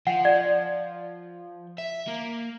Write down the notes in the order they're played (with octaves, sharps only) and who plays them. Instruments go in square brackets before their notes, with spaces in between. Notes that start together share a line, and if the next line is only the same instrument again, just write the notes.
[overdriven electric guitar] F3 [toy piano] F#5
[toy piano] D5
[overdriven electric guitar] E5
A#3